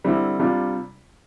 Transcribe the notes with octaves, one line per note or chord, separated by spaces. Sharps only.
D3 G3 C4 E4
C3 G3 D4 F4